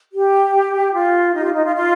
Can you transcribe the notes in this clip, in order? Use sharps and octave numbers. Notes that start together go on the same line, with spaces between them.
G4
F4
D#4
G4
F4
D#4
F4
F4